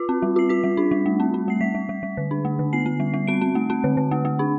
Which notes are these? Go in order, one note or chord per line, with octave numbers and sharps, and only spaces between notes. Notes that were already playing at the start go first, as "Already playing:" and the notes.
Already playing: F4
C4
G3
F4 C7
F4 B6
G3
D4
G3
A3
C4
C4
A3 C7
G3 B6
G3
G3
G3
D3
D4
A3
D3
B3 C7
B3
G3
G3
C4 D7
C4
A3
C4
D3
D3
A3
A3
D4